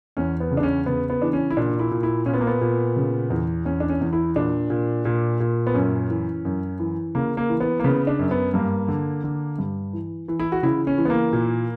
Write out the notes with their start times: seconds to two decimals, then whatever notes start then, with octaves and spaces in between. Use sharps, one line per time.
0.17 E2 C#4
0.40 B3
0.51 C#3
0.57 D4
0.63 C#4
0.86 C#3 B3
1.10 B3
1.21 E3 D4
1.33 C#4
1.51 E4
1.57 A#2 D4
1.80 E4
1.91 A#2
2.03 E4
2.26 A#2 C#4
2.34 B3
2.41 A#3
2.47 B3
2.61 A#2
2.96 C#3
3.30 E2
3.65 E2 C#4
3.80 D4
3.89 C#4
4.01 E2
4.13 E4
4.35 A#2 D4
4.70 A#2
5.05 A#2
5.40 A#2
5.67 B3
5.74 F#2 C#4
6.10 E3
6.45 F#2
6.79 E3
7.15 C#3 A#3
7.37 A#3
7.49 E3
7.60 B3
7.80 A#3
7.84 C#3 B3
8.07 D4
8.19 F#2
8.31 B3
8.54 G2 A#3
8.88 D3
9.24 D3
9.58 G2
9.93 E3
10.28 E3
10.40 E4
10.52 F#4
10.63 C#3 E4
10.87 C#4
10.98 E3
11.05 B3
11.10 A#3
11.33 A#2